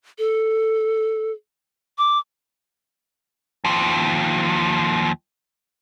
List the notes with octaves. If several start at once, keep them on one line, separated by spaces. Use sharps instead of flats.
A4
D6
D#2 F3